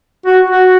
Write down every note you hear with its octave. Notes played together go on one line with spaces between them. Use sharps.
F#4
F#4